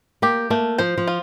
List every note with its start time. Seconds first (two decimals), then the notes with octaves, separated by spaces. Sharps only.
0.22 A#3 G4
0.50 A3 A#3
0.78 F3 C5
0.98 F3
1.07 F4